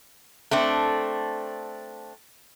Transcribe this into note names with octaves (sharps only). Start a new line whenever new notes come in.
A3 C4 D4